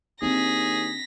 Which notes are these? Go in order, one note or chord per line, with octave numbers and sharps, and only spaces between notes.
D#2 C4 D4 G#4 A#6 B6